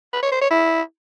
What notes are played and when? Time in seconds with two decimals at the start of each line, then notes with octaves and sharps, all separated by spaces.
0.13 B4
0.22 C#5
0.32 C5
0.41 C#5
0.51 E4